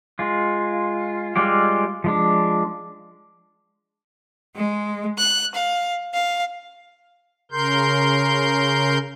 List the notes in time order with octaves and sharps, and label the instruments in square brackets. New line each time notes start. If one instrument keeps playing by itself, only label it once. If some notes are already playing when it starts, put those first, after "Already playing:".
[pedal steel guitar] G#3 F4
G3 G#3 F4 G4
F3 G#3 D4
[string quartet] G#3
F#6
F5
F5
[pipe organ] C#3 A#4 C6 G6